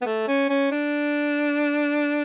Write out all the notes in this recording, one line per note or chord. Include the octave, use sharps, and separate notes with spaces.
B3
A3
C#4
C#4
D4